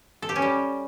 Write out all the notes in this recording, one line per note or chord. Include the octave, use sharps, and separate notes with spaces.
A4
G4
C#4
G3